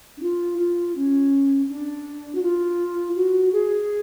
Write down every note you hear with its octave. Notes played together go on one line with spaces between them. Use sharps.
D4
F4
F4
C#4
D4
F#4
F4
F#4
G#4